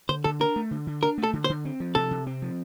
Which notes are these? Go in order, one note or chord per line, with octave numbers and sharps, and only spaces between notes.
D3 C5
D3 A4
D4 A#4
A3
D3
D3
D4 A#4
A3
A4
D3
C5
D3
C4
F3
C3 A4
C3
C4
F3